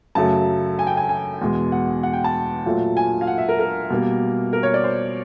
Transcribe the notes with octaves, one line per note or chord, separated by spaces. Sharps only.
F#2 C#3 F#3 A3 A5
G#5
G5
G#5
G#5
E2 B2 G#3
F#5
F#5
G5
A5
A#2 F#3 A3
G#5
F5
F#5
E5
A#4
A#4
B2 G3 A#3
A#4
C#5
D5
C5